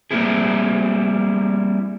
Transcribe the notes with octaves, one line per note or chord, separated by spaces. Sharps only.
G3 A3 A#3 C4 E4 G#4